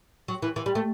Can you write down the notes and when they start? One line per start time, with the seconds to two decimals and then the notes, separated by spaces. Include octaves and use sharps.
0.28 F#3
0.42 E3
0.56 E3
0.66 G3
0.75 A3